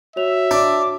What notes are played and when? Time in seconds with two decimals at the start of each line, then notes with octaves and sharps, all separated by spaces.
0.16 F#4 C#5 E5 F7
0.51 D4 D6